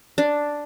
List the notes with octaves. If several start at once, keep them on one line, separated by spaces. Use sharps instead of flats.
D4